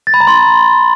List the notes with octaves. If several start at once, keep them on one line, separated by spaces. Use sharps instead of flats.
A6
B5
A#5
C6